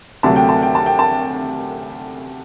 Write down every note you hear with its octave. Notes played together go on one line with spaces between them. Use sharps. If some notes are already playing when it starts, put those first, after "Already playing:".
D2 C3 F#3 A3 A5
G5
A5
G5
A5
G5
A5